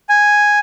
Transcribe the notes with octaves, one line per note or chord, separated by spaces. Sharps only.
G#5